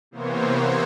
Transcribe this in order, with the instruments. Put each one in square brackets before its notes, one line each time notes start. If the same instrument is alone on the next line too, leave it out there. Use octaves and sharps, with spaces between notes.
[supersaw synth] C3 E3 A#3 B3 C5 C#5